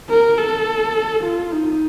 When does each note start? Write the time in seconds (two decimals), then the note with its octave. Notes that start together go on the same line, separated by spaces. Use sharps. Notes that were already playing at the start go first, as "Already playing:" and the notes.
0.09 A#4
0.38 A4
1.24 F4
1.52 D#4